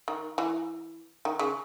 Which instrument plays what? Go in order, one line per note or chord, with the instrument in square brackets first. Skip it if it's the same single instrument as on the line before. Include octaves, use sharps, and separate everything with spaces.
[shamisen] D#3
E3
D#3
C#3